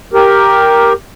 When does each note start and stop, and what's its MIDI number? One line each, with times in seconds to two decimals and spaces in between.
0.13 0.93 67
0.13 0.93 70